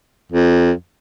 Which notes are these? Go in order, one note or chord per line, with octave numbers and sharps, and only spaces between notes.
F2